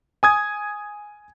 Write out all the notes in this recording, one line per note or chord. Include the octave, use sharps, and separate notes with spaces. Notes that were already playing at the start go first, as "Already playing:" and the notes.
G#5 D#6 G#6